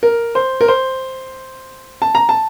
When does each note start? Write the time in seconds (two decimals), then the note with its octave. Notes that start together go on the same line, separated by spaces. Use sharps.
0.03 A#4
0.35 C5
0.61 A#4
0.68 C5
2.02 A5
2.15 A#5
2.29 A5